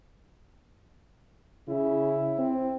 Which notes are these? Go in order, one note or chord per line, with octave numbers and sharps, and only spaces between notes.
C#3 E4
C4